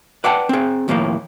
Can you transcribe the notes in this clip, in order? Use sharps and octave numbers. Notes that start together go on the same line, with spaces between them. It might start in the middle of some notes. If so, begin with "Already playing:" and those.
B4 D5 F#5 G5 A5
C4 G#4
D#2 A2 F3 G#3 A#3